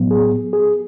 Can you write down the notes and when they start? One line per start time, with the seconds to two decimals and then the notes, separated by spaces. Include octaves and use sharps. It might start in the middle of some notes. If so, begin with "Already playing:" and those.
Already playing: A2 F#3 B3
0.11 G#4
0.53 G#4